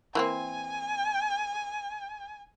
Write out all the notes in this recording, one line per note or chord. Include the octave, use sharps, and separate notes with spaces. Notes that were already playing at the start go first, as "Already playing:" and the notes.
E3 A#3 C4 G#5